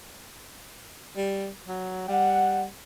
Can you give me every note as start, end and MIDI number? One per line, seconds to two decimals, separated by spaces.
1.16 1.48 55
1.68 2.08 54
2.09 2.66 55
2.09 2.62 78